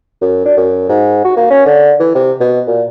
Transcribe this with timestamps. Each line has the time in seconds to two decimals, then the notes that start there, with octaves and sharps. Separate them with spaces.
0.21 F#2
0.45 D4
0.57 F#2
0.89 G#2
1.25 F#4
1.37 A#3
1.51 C#4
1.66 D3
2.00 E3
2.15 C3
2.40 B2
2.67 A#2